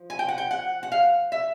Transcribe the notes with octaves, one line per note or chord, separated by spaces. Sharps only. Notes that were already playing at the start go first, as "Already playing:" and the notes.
Already playing: F3
G#5
G5
F#5
G5
F#5
F#5
F5
E5